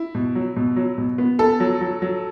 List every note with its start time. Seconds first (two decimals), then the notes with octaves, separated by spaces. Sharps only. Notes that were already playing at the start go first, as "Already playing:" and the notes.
Already playing: E4
0.15 B2
0.35 F#3
0.56 B2
0.76 F#3
0.98 B2
1.18 B3
1.39 B3 A4
1.60 F#3
1.81 F#3
2.02 F#3